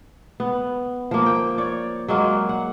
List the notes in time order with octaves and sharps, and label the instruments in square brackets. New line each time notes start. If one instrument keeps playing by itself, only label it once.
[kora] B3
F3 A#3
G5
C#5 D5
F#3 G#3 A#3
F#5